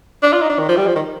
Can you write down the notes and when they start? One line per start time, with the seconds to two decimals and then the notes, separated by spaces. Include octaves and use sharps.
0.22 D4
0.32 F4
0.41 D#4
0.49 D4
0.59 D#3
0.68 F3
0.77 G3
0.87 F3
0.95 D#3